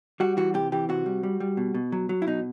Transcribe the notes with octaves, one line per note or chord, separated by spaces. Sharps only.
G3 F#4
E3 F#4
C3 G4
E3 G4
C3 F#4
G3
G3
G3
B2
B2
F#3
F#3
E4
B2 D#4